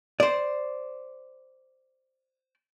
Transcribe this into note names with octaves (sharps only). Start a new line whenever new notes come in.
C5 D5